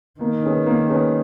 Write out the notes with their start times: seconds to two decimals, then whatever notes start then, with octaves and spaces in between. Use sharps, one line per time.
0.20 D#3 A#3
0.43 C#4 G#4 B4
0.66 A#3
0.89 C#4 G#4 B4